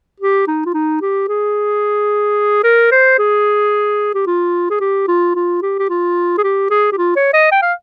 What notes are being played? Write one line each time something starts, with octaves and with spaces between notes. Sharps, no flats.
G4
D#4
F4
D#4
G4
G#4
A#4
C5
G#4
G4
F4
G#4
G4
F4
F4
G4
G4
F4
G#4
G4
G#4
G4
F4
C#5
D#5
G5
F5